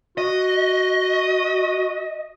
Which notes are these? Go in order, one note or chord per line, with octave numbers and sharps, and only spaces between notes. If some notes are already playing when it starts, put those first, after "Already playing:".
F#4 D#5